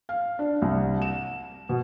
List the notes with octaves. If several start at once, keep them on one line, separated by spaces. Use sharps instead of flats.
F5
D4
C2
E7
B2